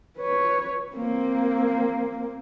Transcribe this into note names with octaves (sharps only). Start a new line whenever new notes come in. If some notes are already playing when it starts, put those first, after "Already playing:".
B4 C#5
A#3 C4